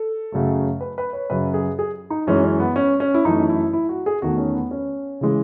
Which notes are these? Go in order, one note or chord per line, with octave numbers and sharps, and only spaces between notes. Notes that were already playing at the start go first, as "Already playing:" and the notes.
Already playing: A4
F#2 C#3 F#3 A3
B4
B4
C#5
F#2 C#3 F#3 B4
G#4
G#4
D#4
F#2 E3 G#3 C#4
C#4
B3
C#4
C#4
E4
F#2 E3 A3 D#4
E4
E4
F#4
G#4
E2 D#3 A3 F#4
C#4
B3
C#4
C#3 E3 G#3